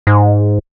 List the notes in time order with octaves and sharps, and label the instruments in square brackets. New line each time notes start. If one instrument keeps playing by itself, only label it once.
[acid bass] G#2